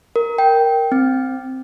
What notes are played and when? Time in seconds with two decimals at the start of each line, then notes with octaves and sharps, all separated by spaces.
0.16 A#4
0.38 G5
0.92 C4